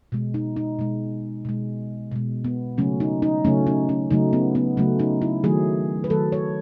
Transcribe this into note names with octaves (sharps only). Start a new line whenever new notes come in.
B2 G#3
D#4
D#4
B2 G#3
B2 G#3
B2 G#3
B3
C#3 F#3 A3 C#4
D#4
D#4
C#3 F#3 A3 C#4
D#4
C#4
C#3 F#3 A3 D#4
B3
B3
C#3 F#3 A3 C#4
D#4
E4
D#3 F#3 A3 G#4
B4
D#3 F#3 A3 A4
C#5